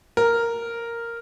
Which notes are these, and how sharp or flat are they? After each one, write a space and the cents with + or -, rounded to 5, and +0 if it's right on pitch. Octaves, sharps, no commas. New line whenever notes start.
A#4 -5